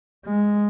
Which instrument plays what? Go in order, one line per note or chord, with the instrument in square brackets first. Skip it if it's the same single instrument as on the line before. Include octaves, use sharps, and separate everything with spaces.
[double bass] G#3